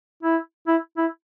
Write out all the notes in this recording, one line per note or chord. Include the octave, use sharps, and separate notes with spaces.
E4
E4
E4